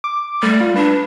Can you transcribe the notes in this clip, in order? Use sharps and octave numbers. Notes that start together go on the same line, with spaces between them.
D6
G3 A3
F4
D4 B4